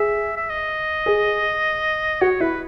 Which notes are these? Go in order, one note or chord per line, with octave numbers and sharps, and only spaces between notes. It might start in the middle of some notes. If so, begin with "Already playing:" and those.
Already playing: G#4 E5
E5
D#5
G#4
F#4 C#5
E4 B4